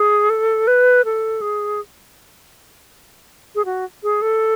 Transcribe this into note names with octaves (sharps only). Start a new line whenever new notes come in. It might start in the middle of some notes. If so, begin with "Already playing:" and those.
Already playing: G#4
A4
B4
A4
G#4
G#4
F#4
G#4
A4